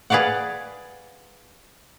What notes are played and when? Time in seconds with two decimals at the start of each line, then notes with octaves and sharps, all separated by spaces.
0.10 G#4 B4 D5 F5 F#5